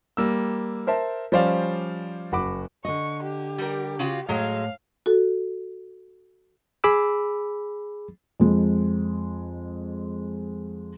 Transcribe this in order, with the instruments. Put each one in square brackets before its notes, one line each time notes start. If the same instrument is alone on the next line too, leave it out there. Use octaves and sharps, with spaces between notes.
[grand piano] G3 A#3 E6
A#4 C5 E5 A5
F3 G3 C#4 C5 D5 F5
F#1 F#4 B5 D6
[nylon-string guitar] D3 D#5 [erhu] C#6
[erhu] G4
[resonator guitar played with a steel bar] G3 A#4
C#3 F4 F#4
[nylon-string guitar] A2 [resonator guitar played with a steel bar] F#3 G#3 [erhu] F5
[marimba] F#4 A4
[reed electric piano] G#4 B5 D6 E6
[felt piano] F2 G#3